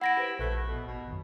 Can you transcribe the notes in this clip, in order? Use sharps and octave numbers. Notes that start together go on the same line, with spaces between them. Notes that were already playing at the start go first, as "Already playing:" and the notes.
E4 F#5 A#6 D7
G4 B4 C5
A#1 A3 F#6 B6
B2
G#1 B2
F#2 D#3